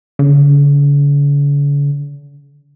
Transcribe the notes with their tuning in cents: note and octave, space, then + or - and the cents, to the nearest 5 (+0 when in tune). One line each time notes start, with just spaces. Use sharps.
D3 -45